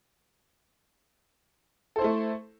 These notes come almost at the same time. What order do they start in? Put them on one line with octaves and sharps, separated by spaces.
A4 C5 E4 A3